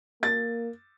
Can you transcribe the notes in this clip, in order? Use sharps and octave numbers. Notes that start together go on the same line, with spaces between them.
A#3 A6